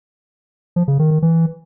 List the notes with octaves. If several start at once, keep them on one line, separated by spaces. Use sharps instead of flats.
F3
C#3
D#3
D#3
E3